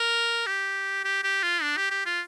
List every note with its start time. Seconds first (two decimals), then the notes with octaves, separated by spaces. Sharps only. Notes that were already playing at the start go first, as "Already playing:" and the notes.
Already playing: A#4
0.46 G4
1.04 G4
1.23 G4
1.43 F4
1.62 D4
1.77 G4
1.91 G4
2.06 F4